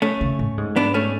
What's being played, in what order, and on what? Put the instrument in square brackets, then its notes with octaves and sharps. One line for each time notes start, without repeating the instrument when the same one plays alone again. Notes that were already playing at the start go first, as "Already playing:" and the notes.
[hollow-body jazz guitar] A3 C#4
[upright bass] C#3
A2
G#2
[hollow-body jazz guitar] B3 D4
A3 C#4